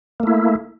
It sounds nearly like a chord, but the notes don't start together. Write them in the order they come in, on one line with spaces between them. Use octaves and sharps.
A#3 A3 E4